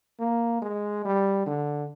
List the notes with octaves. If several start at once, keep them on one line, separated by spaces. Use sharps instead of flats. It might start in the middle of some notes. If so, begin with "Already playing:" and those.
A#3
G#3
G3
D3